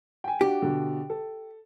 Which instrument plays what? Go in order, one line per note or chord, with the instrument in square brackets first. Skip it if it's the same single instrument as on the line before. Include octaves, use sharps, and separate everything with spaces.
[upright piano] G5 G#5
[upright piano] D4 F#4 [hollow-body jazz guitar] G4
[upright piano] B2 D3
A4